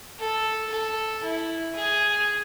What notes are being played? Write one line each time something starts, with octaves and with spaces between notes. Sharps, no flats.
A4
A4
E4
G#4